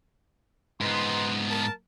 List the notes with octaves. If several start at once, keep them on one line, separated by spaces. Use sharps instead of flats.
G#2 B3 D#4 B4 C6
A#4 A5